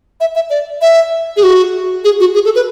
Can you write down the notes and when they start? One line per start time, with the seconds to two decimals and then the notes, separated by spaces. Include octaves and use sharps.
0.21 E5
0.35 E5
0.50 D5
0.82 E5
1.37 G#4
1.43 F#4
2.04 G#4
2.20 F#4
2.35 G#4
2.45 A4
2.55 B4